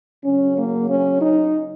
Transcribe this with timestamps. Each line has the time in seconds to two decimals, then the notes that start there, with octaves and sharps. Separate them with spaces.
0.24 C#3 F#3 C#4
0.56 A#3
0.88 C#4
1.21 D#4